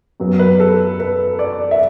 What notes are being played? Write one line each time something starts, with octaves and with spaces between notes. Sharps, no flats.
F#2 F#3 B3
B4
A4
B4
D5
E5